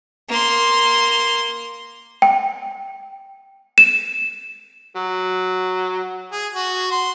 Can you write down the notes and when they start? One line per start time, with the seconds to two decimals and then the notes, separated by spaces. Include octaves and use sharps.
0.29 A#3 C6
2.22 G5
3.78 E7
4.96 F#3
6.32 G#4
6.54 F#4
6.91 C6